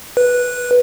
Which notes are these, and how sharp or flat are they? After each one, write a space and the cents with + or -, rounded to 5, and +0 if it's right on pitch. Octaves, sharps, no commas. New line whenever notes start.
B4 -10